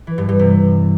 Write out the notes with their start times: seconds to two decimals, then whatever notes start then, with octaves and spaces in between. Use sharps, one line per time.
0.07 E3
0.18 G2
0.29 G2
0.39 C3